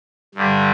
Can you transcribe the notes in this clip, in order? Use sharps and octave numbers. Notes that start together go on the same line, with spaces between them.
G2 D3 G3